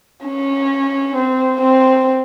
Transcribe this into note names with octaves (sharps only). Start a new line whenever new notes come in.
C#4
C4
C4